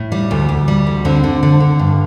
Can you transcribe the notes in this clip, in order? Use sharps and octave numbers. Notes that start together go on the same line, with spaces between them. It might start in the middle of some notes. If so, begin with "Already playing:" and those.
Already playing: A2
G3
D2
D2
G3
D2
D3 C4
D3
D3
D3
G2